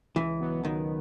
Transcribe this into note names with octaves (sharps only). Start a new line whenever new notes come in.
C#2 E3
B2 F#3 B3
C#2 D#3